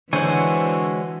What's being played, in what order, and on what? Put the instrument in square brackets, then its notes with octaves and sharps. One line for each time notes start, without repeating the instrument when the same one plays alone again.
[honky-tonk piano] D3 [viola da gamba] E3 [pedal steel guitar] G#3 C#5 G#5 [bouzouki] F#4 C5